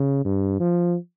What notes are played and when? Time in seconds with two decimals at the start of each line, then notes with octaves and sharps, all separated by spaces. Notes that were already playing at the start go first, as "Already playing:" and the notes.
Already playing: C#3
0.25 G2
0.60 F3